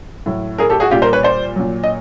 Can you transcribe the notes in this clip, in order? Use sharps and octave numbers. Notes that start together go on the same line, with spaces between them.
A2 F#3
G#4 A#4
G4 A4
F#4 G#4
A#2 G3 F4 G4
A#4 C5
B4 C#5
C5 D5
A#2 F#3
D#5